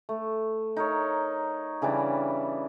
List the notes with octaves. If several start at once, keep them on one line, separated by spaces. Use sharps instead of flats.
A3
D#4 A#4 C#5
C#3 E3 G3 D4